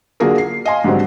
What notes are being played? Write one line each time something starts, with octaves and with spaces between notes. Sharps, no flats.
D3 F#3 A#3 F4 G#4 A#4
C7
D#5 F5 G#5 C6
G#2 D3 F#3 G3 C4